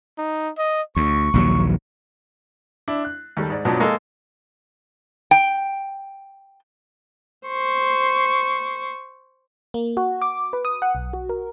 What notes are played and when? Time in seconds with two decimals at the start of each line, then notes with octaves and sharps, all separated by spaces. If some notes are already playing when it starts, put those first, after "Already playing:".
0.18 D#4
0.58 D#5
0.96 D2 C#6
1.34 A#1 D#2 F#3
2.88 D4 E4
3.05 F#6
3.37 D#2 G3 A4
3.50 G#2 D5
3.65 F#2 B2 F3 F#3 B3 D4
3.80 G#3 A#3 A4 A#5
5.31 G5
7.48 C5 C#6
9.74 A#3
9.97 F#4
10.22 D6
10.53 B4
10.65 D#6
10.82 F#5
10.95 B1
11.13 F#4
11.29 A#4